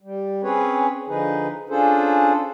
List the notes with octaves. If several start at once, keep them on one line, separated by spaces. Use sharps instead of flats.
G3
C4 C#4 G#4 B4 C#5
D3 F3 D#4 G#4 B4
C#4 D4 F4 G#4 A4 C5